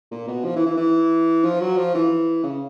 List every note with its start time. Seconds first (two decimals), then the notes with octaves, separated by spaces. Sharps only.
0.11 A#2
0.28 B2
0.45 F3
0.56 E3
0.66 E3
0.77 E3
1.44 F3
1.61 F#3
1.77 F3
1.95 E3
2.44 C#3